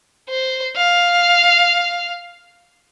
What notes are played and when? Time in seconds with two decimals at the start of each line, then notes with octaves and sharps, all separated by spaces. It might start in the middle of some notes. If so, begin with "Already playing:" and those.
0.29 C5
0.77 F5